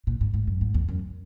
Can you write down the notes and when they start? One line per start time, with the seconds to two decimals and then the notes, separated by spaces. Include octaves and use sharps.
0.07 A#2
0.21 G#2
0.34 G#2
0.47 F#2
0.61 G#2
0.74 E2
0.89 F#2